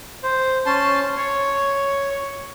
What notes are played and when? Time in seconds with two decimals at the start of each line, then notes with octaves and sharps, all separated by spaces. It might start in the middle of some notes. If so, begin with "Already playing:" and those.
0.23 C5
0.66 C#4 A5 C6
1.17 C#5